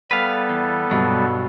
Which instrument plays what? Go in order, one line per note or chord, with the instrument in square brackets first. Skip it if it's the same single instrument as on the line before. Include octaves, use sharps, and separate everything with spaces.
[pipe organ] G3 B3 A4 [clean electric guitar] B4 F5
[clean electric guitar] E2
[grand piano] G2 B2 [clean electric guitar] F#3